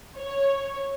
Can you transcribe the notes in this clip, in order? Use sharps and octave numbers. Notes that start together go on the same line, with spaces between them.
C#5